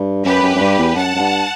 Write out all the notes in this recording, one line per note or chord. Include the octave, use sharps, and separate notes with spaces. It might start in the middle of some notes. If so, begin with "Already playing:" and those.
Already playing: G2
F#2 G4 B4
F#2
F#2
G2
E2
F#2 F#5 A5
F#2
G2